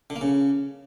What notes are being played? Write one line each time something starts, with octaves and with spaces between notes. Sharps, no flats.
D3
A#3
C#3